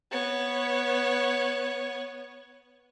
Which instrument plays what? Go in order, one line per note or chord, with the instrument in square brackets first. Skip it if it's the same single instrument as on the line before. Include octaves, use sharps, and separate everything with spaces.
[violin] B3 C#5